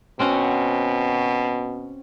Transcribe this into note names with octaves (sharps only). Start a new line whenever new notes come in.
B2 C4 C#4 F#4